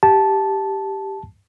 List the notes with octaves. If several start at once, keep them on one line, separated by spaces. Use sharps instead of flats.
G4 A5